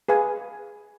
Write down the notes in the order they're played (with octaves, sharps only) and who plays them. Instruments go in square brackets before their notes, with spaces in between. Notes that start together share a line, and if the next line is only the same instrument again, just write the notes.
[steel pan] G#4 B4 F5 G#5